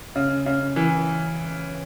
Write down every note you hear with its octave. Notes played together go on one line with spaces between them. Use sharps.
C#3
C#3
E3